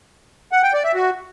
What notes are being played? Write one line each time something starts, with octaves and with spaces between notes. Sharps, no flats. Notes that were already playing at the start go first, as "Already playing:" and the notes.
F#5
G5
D5
E5
F#4